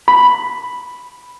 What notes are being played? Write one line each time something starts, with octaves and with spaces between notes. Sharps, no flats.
B5